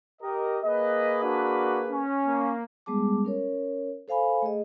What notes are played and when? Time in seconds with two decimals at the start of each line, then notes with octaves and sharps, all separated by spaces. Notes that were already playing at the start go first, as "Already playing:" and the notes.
0.21 G4 A#4 D#5
0.64 A#3 G#4 B4 D#5
1.22 D4 F#4
1.90 C#4
2.26 A#3
2.86 G3 G#3 B3 G#4 A5 D6
3.25 C#4 A#4 C#5
4.08 A4 C5 F5 G#5 B5
4.42 A3 G#4 D#5